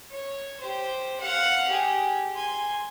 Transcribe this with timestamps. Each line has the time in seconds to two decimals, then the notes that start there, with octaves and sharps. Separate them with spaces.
0.11 C#5
0.61 G4 C5
1.21 F5 F#5
1.68 G4 G#4
2.36 G#5 C6